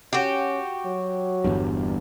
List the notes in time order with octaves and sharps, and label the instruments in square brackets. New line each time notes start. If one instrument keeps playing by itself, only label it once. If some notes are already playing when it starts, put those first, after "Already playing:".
[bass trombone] C#4 [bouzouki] F#4 G4
[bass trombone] F#3
[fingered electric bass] G1 E2 G2